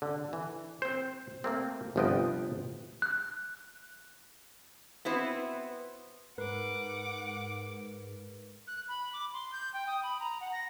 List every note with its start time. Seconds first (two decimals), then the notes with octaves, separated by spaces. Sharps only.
0.02 D3
0.33 E3
0.82 C4 C5
1.44 A3 A#3 C4
1.96 G1 C3 F3 B3 D#5 G5
3.02 F#6
5.05 B3 C4 E4 F#4 B4 C5
6.38 G#2 A#4 B4 F#5 D6
8.67 F#6
8.88 B5
9.13 D6
9.33 C6
9.52 G6
9.74 G5
9.87 D#6
10.03 B5
10.20 A#5
10.41 F#5
10.53 A#6